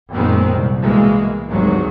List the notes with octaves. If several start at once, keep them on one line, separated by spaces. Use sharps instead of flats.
F#2 A#2 D#3 G#3 B3 C4
C2
B2 E3 G#3 A#3
G#1 D2 G2 D#3 F#3 G#3